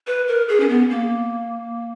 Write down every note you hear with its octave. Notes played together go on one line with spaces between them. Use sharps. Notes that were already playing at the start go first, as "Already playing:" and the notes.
B4
A#4
G#4
C#4
B3
A#3